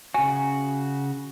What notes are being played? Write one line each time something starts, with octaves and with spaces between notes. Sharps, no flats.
C#3 F#4 G#5